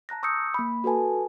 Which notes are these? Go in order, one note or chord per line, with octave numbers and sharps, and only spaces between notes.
A5 A#5 F#6 A#6
C#6 D#6 E6 G6 C#7
A#3 B5
F#4 A4 B4 G#5 A5